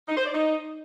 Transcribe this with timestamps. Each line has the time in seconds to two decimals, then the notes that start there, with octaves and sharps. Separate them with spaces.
0.08 D#4
0.17 C5
0.26 D5
0.34 D#4